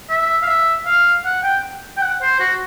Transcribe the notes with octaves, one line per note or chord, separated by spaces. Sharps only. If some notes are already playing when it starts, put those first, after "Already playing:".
E5
F5
E5
F5
F#5
G5
G5
F#5
C5
F#4